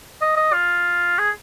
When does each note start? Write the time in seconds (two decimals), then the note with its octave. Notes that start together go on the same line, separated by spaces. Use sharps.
0.21 D#5
0.37 D#5
0.53 F4
1.18 G#4